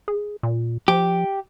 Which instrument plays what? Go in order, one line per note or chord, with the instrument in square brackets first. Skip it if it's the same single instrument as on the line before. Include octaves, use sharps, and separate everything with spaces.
[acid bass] G#4
A#2
[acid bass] F3 [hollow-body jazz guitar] G4